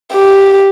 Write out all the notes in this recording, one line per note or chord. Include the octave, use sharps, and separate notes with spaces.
G4